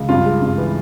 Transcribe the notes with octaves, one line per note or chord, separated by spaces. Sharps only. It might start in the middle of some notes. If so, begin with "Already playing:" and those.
Already playing: C#2
G2 F4
G#3
G2
E3